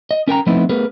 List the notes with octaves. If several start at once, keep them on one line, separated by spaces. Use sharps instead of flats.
D#5
C#4 A#4 G5 A#5
F3 A3 B3 C4 D#4 E4
A3 B3 G#4 A#4 B4